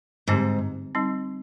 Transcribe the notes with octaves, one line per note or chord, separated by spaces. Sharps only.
G#2 D3 G3 C4 D#4 G4
G3 C4 D#4